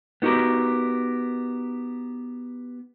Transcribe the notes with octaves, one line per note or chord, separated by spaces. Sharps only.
B3 D#4 F#4 G4 A#4